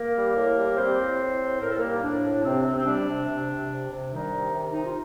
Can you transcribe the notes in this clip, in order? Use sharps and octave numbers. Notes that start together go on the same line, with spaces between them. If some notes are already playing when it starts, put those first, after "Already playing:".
Already playing: A#3 A#4
G3
A2
G3
G3 C4 C5
A2
A2
A2
A2 A#4
A4
G3 A#3 A#4
D#4
A2 D4
A2
C3 C4
C3
C4
G3 D4
C3
C3
C3
C3
C3
D#3 G3 D#4
C3
C3
C3 D#4
F4